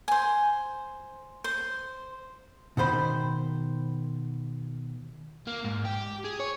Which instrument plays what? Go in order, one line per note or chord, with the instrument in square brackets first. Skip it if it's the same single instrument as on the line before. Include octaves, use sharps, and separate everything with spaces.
[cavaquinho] C5 G#5
C5
[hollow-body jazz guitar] B2 D#3 C5 B5
[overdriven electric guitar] A#3
G#2
G4
G#4
C#5